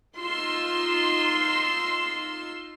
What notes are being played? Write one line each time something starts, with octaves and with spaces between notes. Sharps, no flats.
D#4 F4 C6 E6